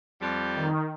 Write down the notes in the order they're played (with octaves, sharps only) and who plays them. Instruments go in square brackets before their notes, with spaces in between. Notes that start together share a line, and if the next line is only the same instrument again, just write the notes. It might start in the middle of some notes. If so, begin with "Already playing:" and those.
[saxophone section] F2 G3
[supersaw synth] D#3